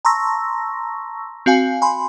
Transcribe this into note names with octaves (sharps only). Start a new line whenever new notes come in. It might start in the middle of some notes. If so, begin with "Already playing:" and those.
A5 A#5 C6 C#6 E6 A#6
C4 F#4 F5 G#5
G#5 B5 C6